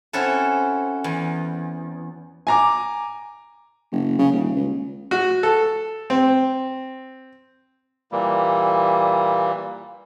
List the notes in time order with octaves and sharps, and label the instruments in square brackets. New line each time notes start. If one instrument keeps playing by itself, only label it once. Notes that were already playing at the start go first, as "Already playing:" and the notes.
[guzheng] C4 C#4 E4 F#4 A4
E2
[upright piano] G#5 A#5 D6
[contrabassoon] F#1
C#3
D#1
C#2
[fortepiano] F#4
A4
C4
[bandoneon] A#2 E3 G3 A#3